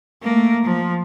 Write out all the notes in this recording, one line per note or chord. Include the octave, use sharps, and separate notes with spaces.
A3 A#3
F3